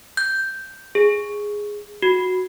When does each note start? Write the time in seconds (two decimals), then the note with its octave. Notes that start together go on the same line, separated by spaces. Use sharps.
0.17 G6
0.95 G#4
2.02 F#4